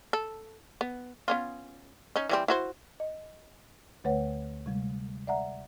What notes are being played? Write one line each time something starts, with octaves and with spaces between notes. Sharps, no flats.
A4
B3
B3 C#4 F4
C#4 D#4
E3 G3 C4
E4 F#4 C5
D#5
D2 D3 A3 B4 C#5 F#5
C3 G3 G#3
D5 E5 F#5 A#5